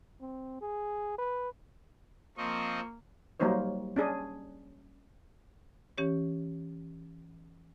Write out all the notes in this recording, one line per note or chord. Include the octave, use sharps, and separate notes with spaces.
C4
G#4
B4
F3 A#3 C4 D#5 C#6
F#3 G3 A#3 D#4 C5 C#5
C#4 D4 G#4
E3 C#4 G4 C#5